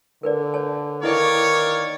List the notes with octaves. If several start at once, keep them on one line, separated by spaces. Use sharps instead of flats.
D3 A#4 B4 D5
C#5 A5
D#3 A#3 E4 B4 C#5 D5